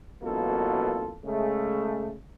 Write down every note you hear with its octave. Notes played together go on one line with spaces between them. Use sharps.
A1 F#2 B2 A#3 F4 A4
C#3 G#3 A3